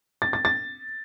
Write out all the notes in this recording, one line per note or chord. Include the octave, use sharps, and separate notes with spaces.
A6
A6
A6